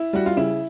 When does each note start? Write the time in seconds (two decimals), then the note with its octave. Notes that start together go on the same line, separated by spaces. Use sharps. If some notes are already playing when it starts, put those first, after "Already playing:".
Already playing: E4
0.13 G3 F#4
0.26 F4
0.37 C#3 E4